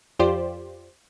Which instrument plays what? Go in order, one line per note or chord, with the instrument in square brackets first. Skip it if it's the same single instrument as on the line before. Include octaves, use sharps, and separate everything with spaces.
[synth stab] F2 F4 G4 C5 D5